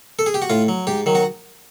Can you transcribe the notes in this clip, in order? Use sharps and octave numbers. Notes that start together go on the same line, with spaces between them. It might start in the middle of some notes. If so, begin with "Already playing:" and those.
A4
G#4
G4
F#4
A2 F4
F#3
G#2 G4
D#3 F#3
F#4